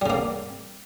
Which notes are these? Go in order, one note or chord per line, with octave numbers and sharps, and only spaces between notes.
C#3 G3 A#3